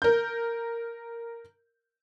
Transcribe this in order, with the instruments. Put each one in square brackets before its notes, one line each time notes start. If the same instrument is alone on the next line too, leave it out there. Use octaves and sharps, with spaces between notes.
[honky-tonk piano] A#4 G6